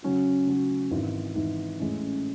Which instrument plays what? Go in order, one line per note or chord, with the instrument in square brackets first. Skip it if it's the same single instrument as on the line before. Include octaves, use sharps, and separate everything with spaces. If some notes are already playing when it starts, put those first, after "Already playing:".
[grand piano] C#3 F#3 C#4 F#4
C#3 F#3 C#4 F#4
G#1 G#2 E3
G#1 G#2 E3
A1 A2 G#3 C#4